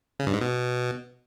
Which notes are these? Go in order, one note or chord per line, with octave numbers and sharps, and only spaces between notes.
C#3
G2
G#2
B2